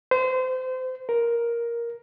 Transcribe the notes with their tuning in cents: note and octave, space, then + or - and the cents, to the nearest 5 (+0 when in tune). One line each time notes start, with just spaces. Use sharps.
C5 -30
A#4 +5